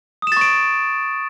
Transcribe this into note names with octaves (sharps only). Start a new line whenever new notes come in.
C#6 D#6 A6 D7 E7